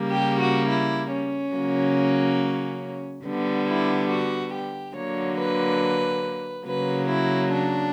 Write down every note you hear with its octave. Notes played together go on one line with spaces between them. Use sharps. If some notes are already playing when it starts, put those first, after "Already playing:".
Already playing: C#3 G3 A#3
G4
F#4
E4
C#4
C#3 F#3 A#3
D3 G3 B3
E4
F#4
G4
D3 F#3 A#3 C#5
B4
C#3 F#3 A#3 B4
E4
D4